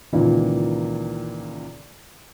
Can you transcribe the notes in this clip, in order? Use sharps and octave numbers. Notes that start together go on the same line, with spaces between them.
C#2 A#2 D#3 E3